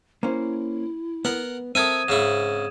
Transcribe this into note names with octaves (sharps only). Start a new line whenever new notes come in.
A#3 C#4 E4 C5
B3 A#4 F#5
C4 A4 A#4 E5 D#6 G#6 D#7
G#2 C#3 E4 G#4 E7